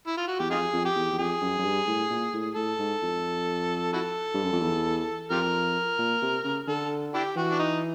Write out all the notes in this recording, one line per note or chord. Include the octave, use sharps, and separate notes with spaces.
E4
F4
F#4
E2 G4
F2 D#4 F4 G#4
F2
G4
E2
E2
F2 G#4
F#2
F#2
G2
A2
A#2
A2
A2 A4
G#2
F2
E4 F#4 A4
G2
F#2
F2
E2
F2 F4 G4 A#4
A#2
C3
C#3
D3 A4
D4 E4 G4
E3 F#4
D4
D#4